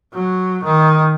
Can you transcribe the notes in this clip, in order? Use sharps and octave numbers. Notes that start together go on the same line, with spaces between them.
F#3
D#3